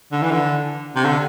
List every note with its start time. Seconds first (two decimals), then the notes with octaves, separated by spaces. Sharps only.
0.12 D3
0.22 E3
0.31 D3
0.96 C3
1.04 D3